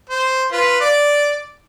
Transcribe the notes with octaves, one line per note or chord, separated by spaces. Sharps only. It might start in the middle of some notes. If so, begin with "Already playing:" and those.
C5
F4 B4
D5